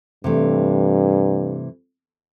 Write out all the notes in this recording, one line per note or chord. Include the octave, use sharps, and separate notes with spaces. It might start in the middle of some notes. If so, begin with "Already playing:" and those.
G2 C3 E3 A3